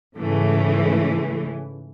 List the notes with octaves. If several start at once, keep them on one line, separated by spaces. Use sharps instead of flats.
G#2 C#3 E3 A3